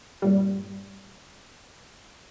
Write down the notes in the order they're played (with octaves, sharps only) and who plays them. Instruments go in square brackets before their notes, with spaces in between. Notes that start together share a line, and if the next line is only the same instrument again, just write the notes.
[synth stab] G2 A#2 G3